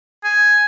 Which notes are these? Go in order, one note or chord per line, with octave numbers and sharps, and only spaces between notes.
G#5